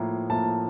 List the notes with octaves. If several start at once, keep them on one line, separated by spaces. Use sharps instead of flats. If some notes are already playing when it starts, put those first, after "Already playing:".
Already playing: A2 F3 A#3
A2 F3 A#3 A5